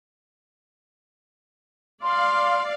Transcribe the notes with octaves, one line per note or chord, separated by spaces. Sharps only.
D5 F5 C6